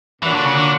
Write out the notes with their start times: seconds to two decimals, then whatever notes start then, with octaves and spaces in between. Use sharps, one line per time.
0.22 A#2 E3 F#3 A#3 D4 F#4
0.33 D3
0.44 C#3
0.55 D3